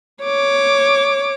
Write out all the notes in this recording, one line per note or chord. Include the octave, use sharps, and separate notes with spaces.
C#5 D6